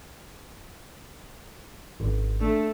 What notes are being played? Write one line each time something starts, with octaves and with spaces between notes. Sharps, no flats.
G#1
A3 D4